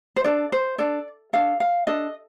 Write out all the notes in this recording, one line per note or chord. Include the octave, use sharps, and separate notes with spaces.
C5
D4 A4 D5
C5
D4 A4 D5
D4 A4 F5
F5
D4 A4 D#5